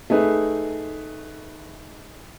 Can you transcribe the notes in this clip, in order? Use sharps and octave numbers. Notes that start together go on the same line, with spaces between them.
A3 D#4 G#4 B4